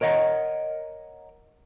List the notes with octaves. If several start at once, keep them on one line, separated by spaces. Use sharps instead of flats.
A#4 C#5 D#5 F#5 A#5